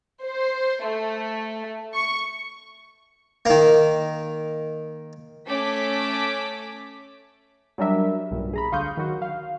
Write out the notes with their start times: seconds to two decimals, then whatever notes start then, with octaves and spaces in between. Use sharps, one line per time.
0.24 C5
0.85 A3
1.94 C#6
3.45 D#3 A#3
5.47 A3 C#4 A5 D6 B6
7.78 F#3 G3 D4 A#4 E5
8.31 B1 G2 A#2
8.53 G#4 A#5 B5
8.72 D2 F5 C6 C#6 D#6 G6
8.97 D#3 F#3 F#4
9.22 F5